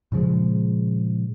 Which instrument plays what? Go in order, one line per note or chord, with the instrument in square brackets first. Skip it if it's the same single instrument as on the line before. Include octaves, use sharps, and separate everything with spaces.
[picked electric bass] A#2 C#3 F3 G#3